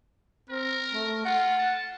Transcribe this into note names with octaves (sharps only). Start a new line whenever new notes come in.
C4 A#4
A3
F4 F#5
A5